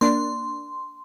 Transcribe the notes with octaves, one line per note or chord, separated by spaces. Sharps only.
A#3 D4 C6